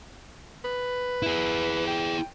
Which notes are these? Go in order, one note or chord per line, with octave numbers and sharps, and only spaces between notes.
B4
E4 G#4
G5